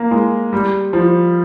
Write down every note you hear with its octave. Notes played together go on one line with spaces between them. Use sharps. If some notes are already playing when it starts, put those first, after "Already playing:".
Already playing: A#3
G#3
G3
F3